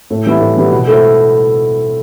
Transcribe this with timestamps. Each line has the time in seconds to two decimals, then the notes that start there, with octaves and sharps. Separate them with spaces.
0.10 A2
0.26 E3 G3 B3 E4
0.41 A2
0.56 E3 G3 B3 E4
0.72 B2
0.88 A3 E4 A4 C5